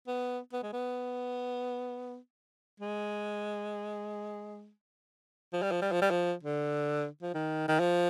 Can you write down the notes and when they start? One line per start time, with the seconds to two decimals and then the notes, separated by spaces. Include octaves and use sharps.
0.07 B3
0.53 B3
0.63 G#3
0.73 B3
2.80 G#3
5.53 F3
5.62 G3
5.71 F3
5.81 G3
5.91 F3
6.01 G3
6.10 F3
6.43 D3
7.22 F3
7.34 D#3
7.68 D#3
7.79 F3